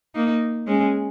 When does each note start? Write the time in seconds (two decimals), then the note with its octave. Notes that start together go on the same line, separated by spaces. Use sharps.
0.15 A#3 D#4
0.67 G#3 C#4